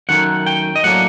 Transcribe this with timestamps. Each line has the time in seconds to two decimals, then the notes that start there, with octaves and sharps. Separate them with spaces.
0.09 F#2 D#3 A3 F#5
0.46 G5
0.76 D#5
0.83 A2 F#3 A#3 D4 F#5